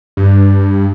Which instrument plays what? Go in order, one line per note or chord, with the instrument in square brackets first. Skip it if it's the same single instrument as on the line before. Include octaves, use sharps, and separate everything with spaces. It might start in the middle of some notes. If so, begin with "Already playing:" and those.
[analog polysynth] G2